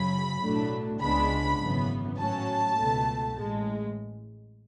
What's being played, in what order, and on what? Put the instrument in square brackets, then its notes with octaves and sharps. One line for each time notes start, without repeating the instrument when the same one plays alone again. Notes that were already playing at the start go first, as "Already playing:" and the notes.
Already playing: [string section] F#2 C#3 F#3 B5
B1 A2 F#3 A3 D4
C#2 C#3 G#3 B3 D4 B5
G#1 F#2 C#3 E3 B3
A2 F#3 C#4 A5
C#2 B2 A3
A1 A2 G#3